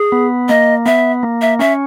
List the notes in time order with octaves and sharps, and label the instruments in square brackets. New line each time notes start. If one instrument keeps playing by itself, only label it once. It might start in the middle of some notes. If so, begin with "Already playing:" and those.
Already playing: [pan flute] G#4
[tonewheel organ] B3
[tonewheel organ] A#3 [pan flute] D#5
[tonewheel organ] B3 [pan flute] E5
[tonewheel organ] A#3
[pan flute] E5
[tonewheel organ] C#4 [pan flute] E5